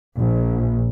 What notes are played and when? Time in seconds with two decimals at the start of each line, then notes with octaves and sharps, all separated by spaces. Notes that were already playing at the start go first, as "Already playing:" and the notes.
0.16 A#1